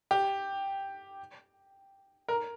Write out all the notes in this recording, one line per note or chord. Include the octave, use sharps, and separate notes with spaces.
G4
A#4